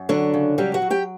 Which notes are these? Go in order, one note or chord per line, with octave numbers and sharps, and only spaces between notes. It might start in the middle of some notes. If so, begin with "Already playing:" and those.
Already playing: F#2
D3 F#3 D4
C#3
F#3 G3 G4
F#4 F#5
F#3
G4 G5